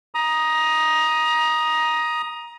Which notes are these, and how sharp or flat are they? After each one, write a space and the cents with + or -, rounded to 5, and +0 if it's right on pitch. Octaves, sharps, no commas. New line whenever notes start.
A#5 +20 D#6 +0